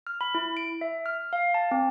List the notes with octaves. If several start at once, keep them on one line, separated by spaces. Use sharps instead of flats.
F6
B5
E4
D7
E5
F6
F5
A5
C4